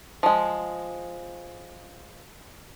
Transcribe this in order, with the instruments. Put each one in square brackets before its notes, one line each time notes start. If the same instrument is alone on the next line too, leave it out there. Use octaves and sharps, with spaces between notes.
[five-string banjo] F3 G#3